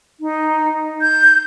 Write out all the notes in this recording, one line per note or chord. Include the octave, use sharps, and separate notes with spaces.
D#4
G6